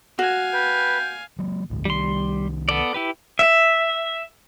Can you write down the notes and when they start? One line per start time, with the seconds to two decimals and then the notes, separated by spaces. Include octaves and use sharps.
0.19 F#4 F5 G#5
0.53 B4 G5
1.39 F#3 G#3 A#3
1.70 A1 D2 G#2
1.85 C2 D#3 G3 C6
2.69 B3 A4 D5
2.94 E4 G4 B4
3.39 E5